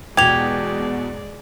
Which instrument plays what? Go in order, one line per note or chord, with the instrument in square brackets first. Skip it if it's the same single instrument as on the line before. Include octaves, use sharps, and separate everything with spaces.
[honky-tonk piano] E2 B2 [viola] G#3 D5 [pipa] G4 [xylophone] G#6 F7